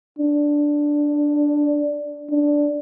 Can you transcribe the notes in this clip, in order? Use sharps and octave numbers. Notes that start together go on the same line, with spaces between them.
D4
D4